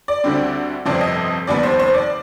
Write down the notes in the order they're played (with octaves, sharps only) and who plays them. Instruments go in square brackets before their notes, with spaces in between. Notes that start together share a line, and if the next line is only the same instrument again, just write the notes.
[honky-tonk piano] D5
D2 D3 G3 C4
G1 F2 C3 F3 C4 D5
D#5
F1 D#2 D#3 G3 B3 D5
C5
C5
D5